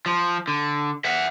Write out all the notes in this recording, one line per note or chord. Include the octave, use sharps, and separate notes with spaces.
F3
D3
E5 F#5